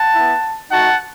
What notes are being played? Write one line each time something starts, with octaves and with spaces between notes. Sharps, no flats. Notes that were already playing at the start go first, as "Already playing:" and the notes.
Already playing: F#5 A5
B3 E4
A3 D#4 F#4 F#5 A5